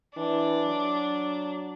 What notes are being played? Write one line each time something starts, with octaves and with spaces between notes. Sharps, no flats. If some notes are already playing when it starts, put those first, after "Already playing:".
E3 D4
F#3